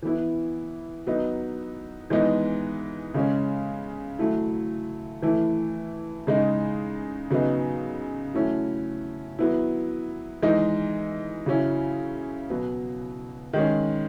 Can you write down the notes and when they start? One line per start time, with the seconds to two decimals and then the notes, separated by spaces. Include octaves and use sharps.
0.02 E3 B3 E4
1.07 F#3 B3 D#4
2.10 E3 G#3 B3 D#4
3.14 C#3 G#3 C#4
4.19 F#3 A3 E4
5.22 E3 A3 E4
6.27 C#3 G#3 D#4
7.31 C#3 F#3 B3 D#4
8.34 F#3 A3 C#4 E4
9.39 F#3 B3 E4
10.42 E3 G#3 D#4
11.46 C#3 F#3 C#4 E4
12.50 B2 F#3 B3
13.53 D#3 G#3 C#4